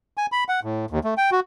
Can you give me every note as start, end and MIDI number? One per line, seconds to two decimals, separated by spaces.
0.17 0.26 80
0.32 0.44 83
0.49 0.60 78
0.63 0.86 45
0.91 0.99 39
1.04 1.14 57
1.17 1.30 79
1.32 1.40 66